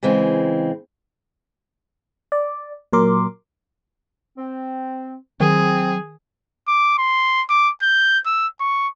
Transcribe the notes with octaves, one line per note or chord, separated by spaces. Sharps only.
C#3 E3 G#3 C4
D5
A#2 F#3 A#4 C6 D6
C4
D#3 F#3 C4 G#4
D6
C6
D6
G6
E6
C#6